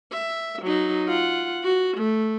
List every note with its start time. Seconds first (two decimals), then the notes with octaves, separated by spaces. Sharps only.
0.12 E5
0.62 F#3 D#4
1.07 F4 F#5
1.63 F#4
1.97 A3